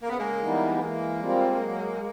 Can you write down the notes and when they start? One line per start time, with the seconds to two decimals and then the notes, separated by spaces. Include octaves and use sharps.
0.03 C#3 A#3
0.10 B3
0.18 G#3 A#3
0.42 E3 G3 B3 D#4
0.80 E3 G#3 A#3
1.20 G3 C4 F4
1.59 F#3